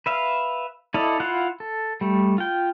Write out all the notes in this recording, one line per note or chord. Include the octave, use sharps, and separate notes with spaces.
B4 E5 F5
E4 A4 D5 D#5 F5
E4 F4 F5 F#5
A4
G3 A3
F4 G5